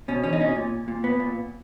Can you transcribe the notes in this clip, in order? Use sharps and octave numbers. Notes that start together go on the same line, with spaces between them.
B2 C#4
E2 C#4
D#4
B2 C#4
A#2
A#2
B3
A#2